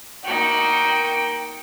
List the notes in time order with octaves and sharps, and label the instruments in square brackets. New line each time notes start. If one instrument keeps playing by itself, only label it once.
[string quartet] A#3 D#4 F#4 [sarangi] G5